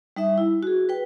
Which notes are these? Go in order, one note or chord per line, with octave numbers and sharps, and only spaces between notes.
G3 D#4 E5
E4
F#4 G#4
B4 G5